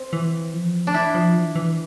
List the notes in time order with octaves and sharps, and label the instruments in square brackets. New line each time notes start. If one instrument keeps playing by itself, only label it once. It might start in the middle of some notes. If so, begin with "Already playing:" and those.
Already playing: [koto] C4
[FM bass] E3
F3
[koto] D4
[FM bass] E3 [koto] E4
[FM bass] F3
E3
E3